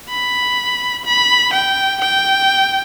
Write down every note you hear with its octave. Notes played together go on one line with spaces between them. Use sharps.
B5
B5
G5
G5